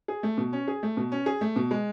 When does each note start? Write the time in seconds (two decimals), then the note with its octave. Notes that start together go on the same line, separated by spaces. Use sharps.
0.08 G#4
0.23 A3
0.37 B2
0.53 C#4
0.68 G#4
0.83 A3
0.97 B2
1.12 C#4
1.26 G#4
1.41 A3
1.56 B2
1.71 G#3